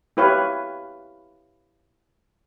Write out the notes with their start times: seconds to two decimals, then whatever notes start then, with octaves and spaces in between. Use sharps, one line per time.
0.17 E4 G4 B4 C#5 F5